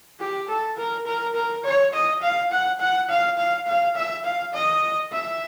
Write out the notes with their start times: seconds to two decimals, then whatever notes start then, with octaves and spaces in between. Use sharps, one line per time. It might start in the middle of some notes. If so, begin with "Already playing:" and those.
0.20 G4
0.49 A4
0.77 A#4
1.06 A#4
1.35 A#4
1.64 C#5
1.93 D#5
2.22 F5
2.51 F#5
2.80 F#5
3.09 F5
3.38 F5
3.67 F5
3.96 E5
4.25 F5
4.54 D#5
5.12 E5